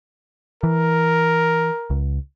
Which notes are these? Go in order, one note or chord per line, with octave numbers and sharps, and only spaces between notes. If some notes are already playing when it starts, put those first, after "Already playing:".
E3 A#4
C#2